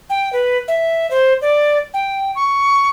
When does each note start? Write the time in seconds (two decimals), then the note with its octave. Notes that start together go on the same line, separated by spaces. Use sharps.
0.10 G5
0.33 B4
0.68 E5
1.11 C5
1.42 D5
1.94 G5
2.35 C#6